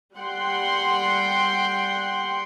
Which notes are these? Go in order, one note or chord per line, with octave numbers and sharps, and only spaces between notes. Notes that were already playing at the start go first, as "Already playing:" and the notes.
G3 F#5 G5 C6